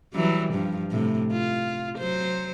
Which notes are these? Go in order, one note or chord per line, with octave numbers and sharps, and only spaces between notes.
E3 F#3 G3
G2 F3
A2 C3
F4
F#3 C5